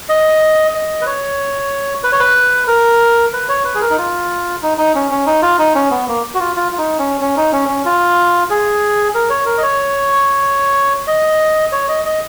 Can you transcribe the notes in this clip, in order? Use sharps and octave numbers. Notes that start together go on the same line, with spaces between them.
D#5
D#5
B4
C#5
B4
C#5
B4
A#4
B4
C#5
B4
G#4
A#4
D#4
F4
D#4
D#4
C#4
C#4
D#4
F4
D#4
C#4
B3
A#3
F#4
F4
F4
F4
D#4
C#4
C#4
D#4
C#4
C#4
F4
G#4
A#4
C#5
A#4
D#5
C#5
D#5
C#5
D#5
D#5